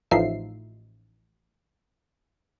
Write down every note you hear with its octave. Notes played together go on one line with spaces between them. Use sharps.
A1 F3 D#4 F4 E5 C7